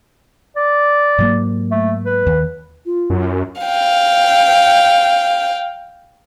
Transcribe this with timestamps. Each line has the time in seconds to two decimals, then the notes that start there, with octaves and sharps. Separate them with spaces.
0.56 D5
1.18 G#2 F#3 A#3
1.71 A3
2.06 B4
2.27 D#2
2.86 F4
3.10 F#2
3.62 F5 G5